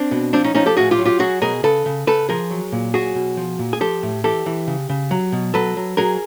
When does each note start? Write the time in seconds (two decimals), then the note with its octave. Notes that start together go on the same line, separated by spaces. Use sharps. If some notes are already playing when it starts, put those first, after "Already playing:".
Already playing: C4 D4
0.11 B2
0.33 F3 C4 D4
0.44 C#4 D#4
0.55 F3 C#4 D#4
0.66 G4 A4
0.77 A2 F#4 G#4
0.91 F4 G4
0.99 F#3
1.05 F4 G4
1.20 F#3 F#4 G#4
1.42 B2 G#4 A#4
1.63 C#3 A4 B4
1.86 C#3
2.07 C#3 A4 B4
2.29 F3 G#4 A#4
2.51 F#3
2.72 A#2
2.94 F#3 F#4 G#4
3.15 B2
3.37 F3
3.59 A#2
3.73 G#4
3.81 F3 G4 A4
4.03 A2
4.24 E3 G4 A4
4.46 E3
4.67 C#3
4.89 C#3
5.11 F#3
5.32 B2
5.54 F#3 A4 B4
5.77 F#3
5.97 F#3 G#4 A#4